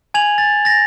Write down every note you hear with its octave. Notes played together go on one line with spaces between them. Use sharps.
G#5 G#6 F7 F#7
A6
A6 A#6